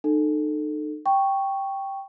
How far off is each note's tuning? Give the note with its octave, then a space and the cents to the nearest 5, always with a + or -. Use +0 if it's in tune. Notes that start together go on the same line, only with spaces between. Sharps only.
D#4 -40 A4 +0
G5 +0 C#6 +0